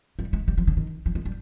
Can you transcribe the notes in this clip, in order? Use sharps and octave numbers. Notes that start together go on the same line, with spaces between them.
G3
G#3
G3
F3
D3
D#3
F3
G#3
G3